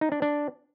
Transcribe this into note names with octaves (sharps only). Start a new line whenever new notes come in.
D#4
D4
D4